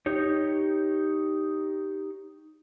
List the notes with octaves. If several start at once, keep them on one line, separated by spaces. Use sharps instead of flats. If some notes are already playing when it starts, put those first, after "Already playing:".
D#4 G4 C#5